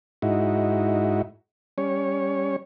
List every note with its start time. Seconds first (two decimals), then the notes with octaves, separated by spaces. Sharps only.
0.22 G#2 D#4 E4 F#4
1.78 G3 C#4 C#5